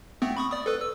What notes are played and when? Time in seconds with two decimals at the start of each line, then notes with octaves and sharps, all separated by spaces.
0.22 A3 B3 C4
0.37 B5 C#6 D#6
0.51 D5 D#6
0.66 A4 B4
0.81 E6